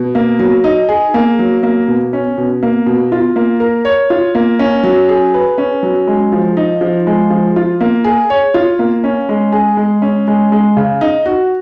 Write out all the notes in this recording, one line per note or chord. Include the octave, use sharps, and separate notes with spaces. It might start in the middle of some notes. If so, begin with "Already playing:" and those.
Already playing: B2
A#3
F#3
D#4
G#4
A#3
F#3
A#3
B2
C#4
B2
A#3
B2
F4
A#3
A#4
C#5
F4
A#3
C#4
F#3
G#4
B4
C#4
F#3
G#3
F3
D#4
F3
G#3
F3
F4
A#3
G#4
C#5
F4
A#3
C#4
G#3
G#4
G#3
C#4
G#3
G#3
C#3
D#4
F#4